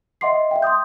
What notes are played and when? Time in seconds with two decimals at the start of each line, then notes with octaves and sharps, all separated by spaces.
0.21 D#5 E5 F#5 C6 D6 C7
0.51 E5 F5 G5
0.62 C6 D6 D#6 G6